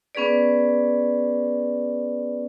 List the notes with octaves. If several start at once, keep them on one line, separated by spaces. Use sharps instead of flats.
B3 C#4 G#4 B4 D5